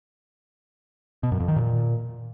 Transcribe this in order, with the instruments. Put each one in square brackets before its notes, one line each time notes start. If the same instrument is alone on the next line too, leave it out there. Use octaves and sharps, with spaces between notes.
[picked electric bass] B2
F#2
F2
D#3
A#2